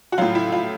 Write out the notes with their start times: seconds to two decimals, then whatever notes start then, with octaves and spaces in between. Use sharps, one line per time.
0.12 F#4
0.18 A2 F#3 F4
0.35 E4
0.52 F4